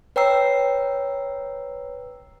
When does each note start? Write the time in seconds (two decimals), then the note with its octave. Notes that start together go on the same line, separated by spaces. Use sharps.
0.16 B4 C#5 G5 A#5 E6 C7